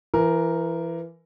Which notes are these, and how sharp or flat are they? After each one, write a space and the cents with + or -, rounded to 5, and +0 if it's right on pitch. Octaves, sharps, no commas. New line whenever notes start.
E3 +25 A#4 +0